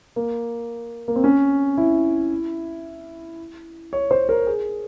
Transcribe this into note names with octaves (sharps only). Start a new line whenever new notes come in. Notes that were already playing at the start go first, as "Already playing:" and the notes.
A#3
A#3
C4
C#4
E4
C#5
C5
A#4
G#4